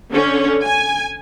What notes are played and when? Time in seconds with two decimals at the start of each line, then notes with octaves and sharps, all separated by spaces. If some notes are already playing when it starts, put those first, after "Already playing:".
0.11 D3 C#4
0.63 G#5